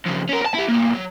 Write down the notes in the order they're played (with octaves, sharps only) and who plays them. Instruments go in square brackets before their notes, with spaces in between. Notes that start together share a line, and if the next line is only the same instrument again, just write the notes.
[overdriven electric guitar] F2 C#3
C#4 A#4
A#4 A5
E4 G4
A2 A#3
F#3